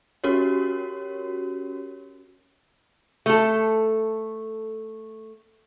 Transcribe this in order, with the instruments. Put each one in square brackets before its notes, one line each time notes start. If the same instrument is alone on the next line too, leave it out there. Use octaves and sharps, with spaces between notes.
[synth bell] C#4 F#4 G4 A#4 C#5
[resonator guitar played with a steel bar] A3 A4